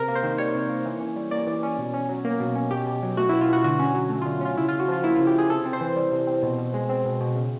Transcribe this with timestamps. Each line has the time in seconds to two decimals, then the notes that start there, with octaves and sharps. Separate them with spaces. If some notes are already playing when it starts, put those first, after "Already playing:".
Already playing: C3 A#4
0.08 A#3
0.15 C5
0.23 D#3
0.38 G3 C#5
0.55 C3
0.69 A#3
0.85 E3
1.00 C#4
1.16 G3
1.31 A#3 D5
1.47 E3
1.63 C#4
1.78 B2
1.94 C#4
2.09 F#3
2.24 A#3
2.40 B2
2.56 C#4
2.71 B2 G4
2.87 B2
3.03 F#3
3.17 A3 F#4
3.29 E4
3.33 B2
3.41 F4
3.49 B2 F#4
3.64 D3 F#4
3.79 C#4
3.95 F#3
4.10 A3
4.22 F4
4.25 D3
4.41 C#4 F4
4.57 C#3 E4
4.68 F4
4.73 C#3
4.80 F#4
4.88 F3 F4
5.04 A#3 E4
5.15 F4
5.19 C#3
5.27 G4
5.34 C#3 G#4
5.50 C3 A4
5.65 C4
5.73 C5
5.81 E3
5.96 G3
6.12 C3
6.27 C4
6.43 B2
6.58 B2
6.74 G#3
6.89 C4
7.05 B2
7.21 B2
7.36 C#3